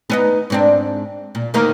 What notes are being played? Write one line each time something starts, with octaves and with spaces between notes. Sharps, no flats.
B3 C4 D#4
G#2 C4 D4
A#2
D2 D#3 A#3